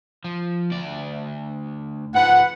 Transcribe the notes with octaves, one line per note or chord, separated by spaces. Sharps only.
F3
D2 D5
G#2 F3 B4 F#5